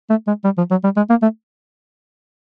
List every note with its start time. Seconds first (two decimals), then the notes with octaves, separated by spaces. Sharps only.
0.10 A3
0.27 G#3
0.44 G3
0.57 F3
0.71 F#3
0.84 G3
0.96 G#3
1.10 A#3
1.22 A3